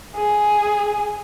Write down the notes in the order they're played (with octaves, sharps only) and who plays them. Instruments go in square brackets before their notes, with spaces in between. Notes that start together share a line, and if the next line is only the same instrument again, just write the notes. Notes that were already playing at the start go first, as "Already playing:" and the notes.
[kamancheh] G#4